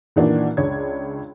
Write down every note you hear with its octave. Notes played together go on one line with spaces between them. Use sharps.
A#2 D#3 E3 A#3 D4 F#4
C#2 D4 C#5 G#6